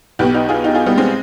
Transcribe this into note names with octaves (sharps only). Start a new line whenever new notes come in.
B1 B2 G4 B4
D#4 G4
F4 G#4
D#4 G4
F4 G#4
G3 B3
G#3 C4